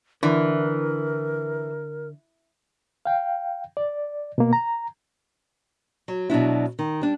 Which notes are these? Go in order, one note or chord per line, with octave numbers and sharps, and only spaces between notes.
D3 E3 A#4
F5 G5
D5
B2 A#3
A#5
F#3
B2 F#3 D4 E4
D#3
G3 D4